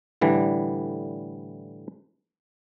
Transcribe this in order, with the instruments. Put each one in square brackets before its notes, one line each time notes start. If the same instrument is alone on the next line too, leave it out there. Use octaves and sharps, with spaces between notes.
[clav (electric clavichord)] A2 D3 E3 G3